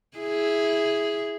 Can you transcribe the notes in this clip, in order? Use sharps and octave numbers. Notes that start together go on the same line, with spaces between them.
E4 G#4